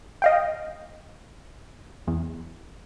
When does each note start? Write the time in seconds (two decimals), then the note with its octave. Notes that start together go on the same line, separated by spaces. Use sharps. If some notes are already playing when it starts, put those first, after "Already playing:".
0.22 D#5 F5 G5
2.07 E2